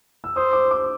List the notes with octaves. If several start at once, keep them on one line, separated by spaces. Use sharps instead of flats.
E6
C5 D#6
D6
D6